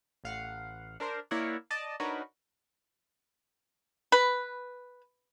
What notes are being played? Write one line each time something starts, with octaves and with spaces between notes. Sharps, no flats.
A1 F5 F#5
D4 A#4 C5
A#3 E4 A#4 C#5 D5 F#5
D5 D#5 A5
D4 D#4 F#4 A#4 B4 C#5
B4